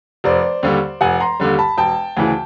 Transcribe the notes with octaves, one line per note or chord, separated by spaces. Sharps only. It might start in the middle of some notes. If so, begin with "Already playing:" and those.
F1 C5 D5
D#2 D3 G3
F1 F#5 G#5
A#5 C6
D#2 D3 G3
A5 B5
E1 G5 A5
D2 C#3 E3